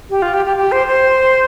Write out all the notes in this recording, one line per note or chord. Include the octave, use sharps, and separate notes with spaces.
G4
F4
G4
G4
G4
C5
C5